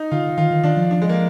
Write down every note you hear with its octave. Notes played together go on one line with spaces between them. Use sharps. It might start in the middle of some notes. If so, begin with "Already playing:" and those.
Already playing: D#4
D3 F4
D#3 F4
D#3
D#3 D4
F3
D4
G#3
A#3